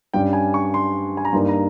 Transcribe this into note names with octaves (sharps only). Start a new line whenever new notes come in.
G2 G3 C#4 G5
G#5
C#6
C6
G#5
A#5
G2 G3 A#3 D#4 C6
A#5